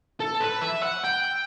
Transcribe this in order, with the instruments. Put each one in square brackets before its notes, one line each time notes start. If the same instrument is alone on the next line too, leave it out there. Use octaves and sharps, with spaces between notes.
[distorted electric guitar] A4
B4
E5
F#5
G5